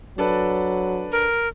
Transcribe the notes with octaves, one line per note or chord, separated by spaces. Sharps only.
F#3 D4 A4 B4
A#4